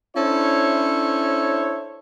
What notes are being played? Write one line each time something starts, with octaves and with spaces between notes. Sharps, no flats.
C#4 D4 E4 A4 C5 C#5